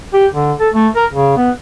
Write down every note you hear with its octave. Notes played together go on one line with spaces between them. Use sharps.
G4
D3
A4
A3
A#4
C#3
B3